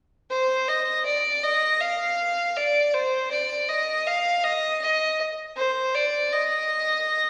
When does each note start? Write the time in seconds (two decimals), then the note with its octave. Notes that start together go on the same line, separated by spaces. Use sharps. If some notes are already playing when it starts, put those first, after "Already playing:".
0.30 C5
0.69 D#5
1.06 D5
1.43 D#5
1.81 F5
2.57 D5
2.94 C5
3.32 D5
3.69 D#5
4.07 F5
4.45 D#5
4.82 D#5
5.57 C5
5.95 D5
6.32 D#5